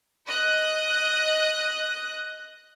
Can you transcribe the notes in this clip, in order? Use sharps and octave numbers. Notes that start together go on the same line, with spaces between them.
D#5 F#6